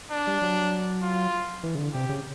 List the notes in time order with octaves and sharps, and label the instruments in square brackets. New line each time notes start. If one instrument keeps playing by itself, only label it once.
[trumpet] D4
[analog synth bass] G3
F#3
[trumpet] F4
[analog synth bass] E3
C#3
D3
[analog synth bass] C3 [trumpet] G4
[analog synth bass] C#3